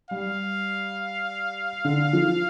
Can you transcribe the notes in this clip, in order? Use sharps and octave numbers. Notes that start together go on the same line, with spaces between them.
G3 F5
D3
F3